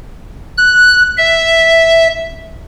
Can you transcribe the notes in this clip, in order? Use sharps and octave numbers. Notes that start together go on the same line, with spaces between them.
F#6
E5